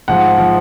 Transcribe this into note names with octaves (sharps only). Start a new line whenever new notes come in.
G#2 F3 F#5
F3